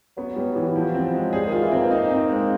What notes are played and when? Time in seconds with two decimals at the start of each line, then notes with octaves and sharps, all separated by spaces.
0.17 F#3 B3
0.36 G3
0.56 E3
0.76 F3
0.94 C4
1.14 G#3
1.33 G3 G#4
1.47 D#3 F4
1.62 E3
1.72 C4
1.77 A#3
1.91 D#4
2.11 C4
2.29 G#3